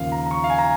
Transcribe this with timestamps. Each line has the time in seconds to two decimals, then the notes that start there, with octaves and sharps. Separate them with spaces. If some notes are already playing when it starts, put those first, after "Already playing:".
Already playing: D#2 C#3 F3 F5
0.12 A#5
0.26 A#5
0.31 C#6
0.44 F5
0.50 G#5
0.58 A#5